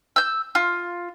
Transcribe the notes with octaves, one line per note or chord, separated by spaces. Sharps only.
E6 G6
F4